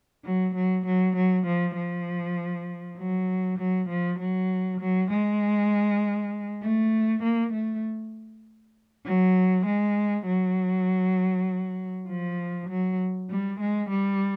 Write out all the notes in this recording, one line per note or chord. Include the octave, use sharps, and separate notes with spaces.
F#3
F#3
F#3
F#3
F3
F3
F#3
F#3
F3
F#3
F#3
G#3
A3
A#3
A3
F#3
G#3
F#3
F3
F#3
G3
G#3
G3